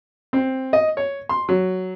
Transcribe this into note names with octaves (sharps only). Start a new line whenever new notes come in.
C4
D#5
C#5
C6
F#3